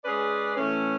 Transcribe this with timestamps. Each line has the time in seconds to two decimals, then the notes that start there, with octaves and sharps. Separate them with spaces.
0.05 G#3 C#4 G#4 B4 D5
0.57 A2 E3 A3 C#4